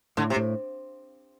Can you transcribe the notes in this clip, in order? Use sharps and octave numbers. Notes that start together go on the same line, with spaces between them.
A2 D3
C3
A2